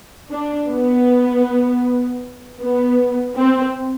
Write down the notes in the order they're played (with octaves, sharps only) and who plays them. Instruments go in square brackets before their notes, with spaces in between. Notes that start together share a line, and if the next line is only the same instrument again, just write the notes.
[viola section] D4
B3
B3
C4